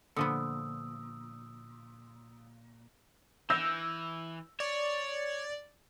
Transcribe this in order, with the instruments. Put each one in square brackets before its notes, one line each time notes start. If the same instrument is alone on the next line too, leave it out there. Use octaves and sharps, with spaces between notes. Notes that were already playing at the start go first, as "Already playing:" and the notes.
[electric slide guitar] A#2 [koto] D3 F3 B3 [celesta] D#6 E6
[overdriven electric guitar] E3 [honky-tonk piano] E6 G6 A#6
[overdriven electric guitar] C#5 [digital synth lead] D5